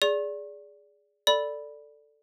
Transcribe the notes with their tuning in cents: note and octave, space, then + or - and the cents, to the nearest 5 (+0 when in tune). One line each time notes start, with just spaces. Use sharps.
G#4 +0 D5 -15 C#6 -45
A4 +10 D5 +0 B5 +0